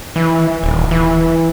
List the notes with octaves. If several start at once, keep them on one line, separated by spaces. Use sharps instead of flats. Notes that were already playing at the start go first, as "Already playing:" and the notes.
E3
D#1
E3